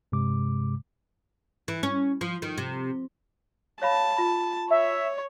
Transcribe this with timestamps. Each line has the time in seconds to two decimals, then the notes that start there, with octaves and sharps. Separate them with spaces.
0.12 G2 C3 G#3 D6
1.68 E3
1.83 C#4
2.21 F3
2.42 D#3
2.58 C3
3.82 C#5 F5 A5 B5
4.17 F4 B5
4.70 C#5 E5